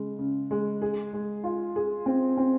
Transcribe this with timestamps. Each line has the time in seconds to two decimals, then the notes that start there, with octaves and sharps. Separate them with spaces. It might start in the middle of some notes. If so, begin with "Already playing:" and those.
Already playing: C#3 G#3
0.19 C#3
0.51 G#3
0.82 G#4
1.13 G#3
1.44 F4
1.76 G#4
2.06 C4
2.37 C4